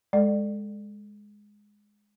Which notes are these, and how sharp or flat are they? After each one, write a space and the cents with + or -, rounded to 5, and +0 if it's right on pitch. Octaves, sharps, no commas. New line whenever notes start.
G#3 +0 A4 +0 D5 +25